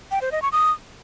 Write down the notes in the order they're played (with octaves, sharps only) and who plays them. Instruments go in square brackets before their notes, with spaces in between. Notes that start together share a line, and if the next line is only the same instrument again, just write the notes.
[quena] G5
C5
D#5
C#6
D#6